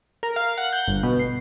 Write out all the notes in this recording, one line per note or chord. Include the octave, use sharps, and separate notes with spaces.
A#4
F5
F#5
G6
G1
B2
C7